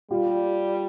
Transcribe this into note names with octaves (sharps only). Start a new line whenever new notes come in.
G3 F4 G4